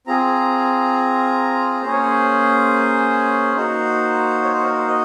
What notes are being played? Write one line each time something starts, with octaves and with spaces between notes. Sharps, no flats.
C4 F4 G#4 A#5
A#3 C#4 G#4 C5
C#5
C5
A#3 D#4 F#4 C5
C#5
C5
A#4
C5
D#5